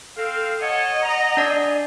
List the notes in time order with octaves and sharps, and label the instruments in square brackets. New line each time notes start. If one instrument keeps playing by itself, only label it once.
[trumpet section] C4 F5 [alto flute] A4
[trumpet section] A4 C#5 [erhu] D#5 [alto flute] F#5
[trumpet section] A#5
[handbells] D4 D5 [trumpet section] G#4